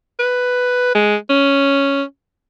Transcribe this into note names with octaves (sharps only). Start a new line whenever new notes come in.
B4
G#3
C#4